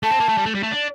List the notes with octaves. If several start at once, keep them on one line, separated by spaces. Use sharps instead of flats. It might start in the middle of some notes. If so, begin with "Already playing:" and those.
A3 A5
C4
A#3
A3
G3
A3
G3
A3
D4